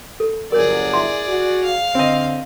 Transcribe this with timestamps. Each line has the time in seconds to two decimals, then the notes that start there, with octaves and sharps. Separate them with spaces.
0.20 A4
0.52 G1 F#3 G#4 A#4 C#5 D5
0.94 E4 E5 C6
1.27 F#4
1.64 F5
1.95 D3 C4 D#5